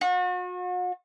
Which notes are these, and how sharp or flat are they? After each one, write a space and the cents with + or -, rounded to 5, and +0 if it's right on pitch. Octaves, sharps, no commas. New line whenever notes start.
F#4 -40